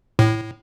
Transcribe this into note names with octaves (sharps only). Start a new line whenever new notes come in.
A2